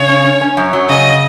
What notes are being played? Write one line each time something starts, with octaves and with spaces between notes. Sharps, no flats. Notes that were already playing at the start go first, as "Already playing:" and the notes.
Already playing: C#3 C#5
C#4
C#4
C#4
F#2
F#3
C#3 D#5